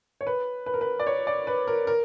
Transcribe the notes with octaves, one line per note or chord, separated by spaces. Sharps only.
C#5
B4
B4
A#4
B4
D5
C#5
D5
B4
A#4
A#4